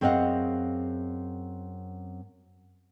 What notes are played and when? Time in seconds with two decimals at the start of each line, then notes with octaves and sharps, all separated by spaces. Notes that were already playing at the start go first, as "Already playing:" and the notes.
0.01 F#2 C4 G#4 D#5 F5 F#5